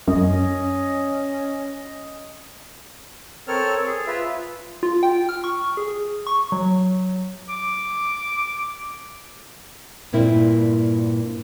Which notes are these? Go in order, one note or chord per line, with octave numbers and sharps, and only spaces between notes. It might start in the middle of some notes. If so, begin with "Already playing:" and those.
F#2 C#4 D#5
C4 A4 A#4 C#5 F6
G#4
F4 B4 E5
F4
G5
F6
C#6
G#4
C#6
F#3
D6
G2 A#2 A#3 C4 E4